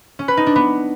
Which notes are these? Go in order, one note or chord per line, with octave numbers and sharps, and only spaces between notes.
C#4
B4
D#4
D4
B3